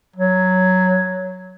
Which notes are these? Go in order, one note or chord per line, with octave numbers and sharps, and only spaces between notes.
F#3